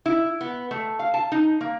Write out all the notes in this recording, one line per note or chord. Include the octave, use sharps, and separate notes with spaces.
E4
B3
A3
F5
A5
D#4
A#3